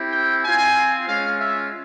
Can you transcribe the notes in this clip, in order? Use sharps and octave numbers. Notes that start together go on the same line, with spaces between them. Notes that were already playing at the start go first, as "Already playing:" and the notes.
Already playing: C4 E4 G4
G5
C4 F4 G#5
G#3 C#4 F4 F5
E5